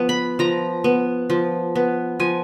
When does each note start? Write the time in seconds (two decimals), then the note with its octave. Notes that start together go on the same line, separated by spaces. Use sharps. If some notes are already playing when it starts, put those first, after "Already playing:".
Already playing: F3 B3
0.09 B5
0.39 F3 A#5
0.84 B3
1.30 F3
1.75 B3
2.20 F3 G#5